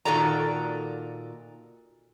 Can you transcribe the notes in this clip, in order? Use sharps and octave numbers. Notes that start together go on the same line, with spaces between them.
A#2 D#3 F#4 A4 D5 A#5